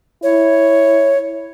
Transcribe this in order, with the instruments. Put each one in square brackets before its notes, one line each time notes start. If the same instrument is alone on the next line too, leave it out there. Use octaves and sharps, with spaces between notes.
[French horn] E4 [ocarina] C#5